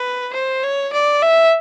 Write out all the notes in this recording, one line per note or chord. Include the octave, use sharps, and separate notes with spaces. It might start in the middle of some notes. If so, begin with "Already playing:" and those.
Already playing: B4
C5
C#5
D5
E5